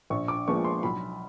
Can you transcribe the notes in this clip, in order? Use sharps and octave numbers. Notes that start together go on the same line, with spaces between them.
A#1 C#6
D6
A#2 F3 G#3 B3 C#6
C6
B1 B5